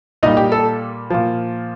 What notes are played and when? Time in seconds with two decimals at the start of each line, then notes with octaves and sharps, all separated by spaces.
0.23 A#2 G3 D#4 D#5
0.37 G4
0.52 A4
1.10 A#2 F3